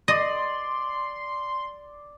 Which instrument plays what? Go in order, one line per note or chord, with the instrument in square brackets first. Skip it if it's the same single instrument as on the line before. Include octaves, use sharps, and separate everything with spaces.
[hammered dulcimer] D5 [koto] D#5 [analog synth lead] C6